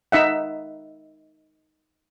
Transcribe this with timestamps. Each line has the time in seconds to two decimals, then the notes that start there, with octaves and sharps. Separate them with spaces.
0.12 D#4 E5 F#5